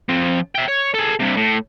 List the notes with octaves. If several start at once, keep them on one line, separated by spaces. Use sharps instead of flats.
F3 C4
E5 G5
C#5
G#4 A4
G2 C3
A2